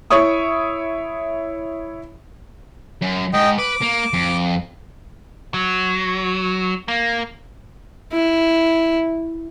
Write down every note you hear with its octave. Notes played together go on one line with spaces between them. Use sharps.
E4 C#5 E5 C#6 D#6
F#2
G#2 D#5 G5
B4 D6
A#3
F2
F#3
A#3
E4